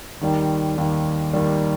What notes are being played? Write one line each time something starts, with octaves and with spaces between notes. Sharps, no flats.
D#2 D#3 G3
D#2 D#3 G3
D#2 D#3 G3